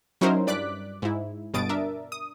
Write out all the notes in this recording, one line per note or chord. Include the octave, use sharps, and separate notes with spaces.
F#3 C#4 D#4 E4 A#4 C5
G2 D5 D6 F#6 B6
G#2 E4
G1 G2 B2 D#6 A6 D7
D4 A#4 E5
D#6